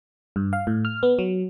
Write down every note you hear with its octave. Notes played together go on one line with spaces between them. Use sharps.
G2
F5
A2
F6
B3
F#3